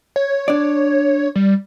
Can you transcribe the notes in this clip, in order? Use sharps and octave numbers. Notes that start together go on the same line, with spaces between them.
C#5
D4 D5
G3